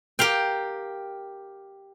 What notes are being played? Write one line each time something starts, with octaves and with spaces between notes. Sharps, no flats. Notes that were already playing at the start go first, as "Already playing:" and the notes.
G4 A#4 F5 G5